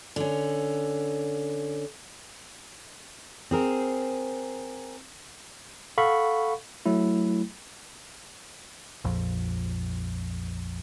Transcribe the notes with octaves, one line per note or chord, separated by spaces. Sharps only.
D3 C#4
C4 G#4 A#4
A4 F5 F#5 B5 C#6
F#3 A3 E4
A#1 F2